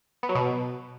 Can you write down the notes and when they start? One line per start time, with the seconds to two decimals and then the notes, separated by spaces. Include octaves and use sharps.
0.23 B3
0.29 F#3
0.35 B2